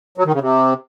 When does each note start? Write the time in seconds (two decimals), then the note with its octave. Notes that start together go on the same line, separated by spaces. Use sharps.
0.18 F#3
0.25 D#3
0.33 C#3
0.41 C3